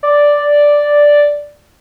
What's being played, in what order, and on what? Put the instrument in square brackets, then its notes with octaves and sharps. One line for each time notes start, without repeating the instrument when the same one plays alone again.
[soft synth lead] D5